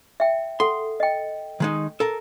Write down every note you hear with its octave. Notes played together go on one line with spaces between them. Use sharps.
E5 G5
A4 F#5 C6
D#5 G5
D#3 G#3 D#4
A4 A#4